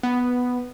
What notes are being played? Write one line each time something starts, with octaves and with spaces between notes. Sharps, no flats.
B3